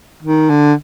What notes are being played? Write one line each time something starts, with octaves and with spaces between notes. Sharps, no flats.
D#3
D3